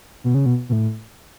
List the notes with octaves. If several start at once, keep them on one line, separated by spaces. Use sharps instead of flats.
B2
C#3
B2
B2
A2